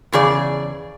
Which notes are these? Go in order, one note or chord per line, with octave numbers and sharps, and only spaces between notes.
E2 C#3 G#4 D5